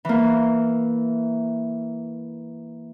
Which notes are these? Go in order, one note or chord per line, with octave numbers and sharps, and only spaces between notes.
E3 A#3